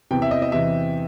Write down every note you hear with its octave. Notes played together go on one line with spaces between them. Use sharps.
E2 C3 E3 G5
E5
D#5
D#5
E2 C3 E3 E5